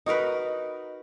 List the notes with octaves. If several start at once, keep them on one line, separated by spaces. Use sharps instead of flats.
D#4 F#4 A#4 B4